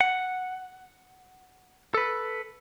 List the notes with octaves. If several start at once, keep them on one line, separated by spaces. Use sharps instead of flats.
F#5
A4 B4